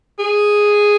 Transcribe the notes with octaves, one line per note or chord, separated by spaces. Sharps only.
G#4